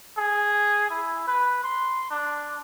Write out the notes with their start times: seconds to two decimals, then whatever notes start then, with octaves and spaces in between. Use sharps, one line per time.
0.17 G#4
0.90 E4
1.28 B4
1.64 C6
2.11 D4